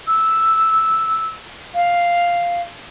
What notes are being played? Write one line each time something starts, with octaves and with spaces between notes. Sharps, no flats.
E6
F5